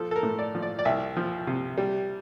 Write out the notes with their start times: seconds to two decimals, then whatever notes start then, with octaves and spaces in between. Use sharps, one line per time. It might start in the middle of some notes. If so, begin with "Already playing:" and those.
Already playing: F3 A4
0.11 A4
0.16 A#4
0.23 A2
0.39 D5
0.55 F3
0.62 D5
0.79 D5
0.85 C2 E5
1.17 F3
1.47 C3
1.77 G3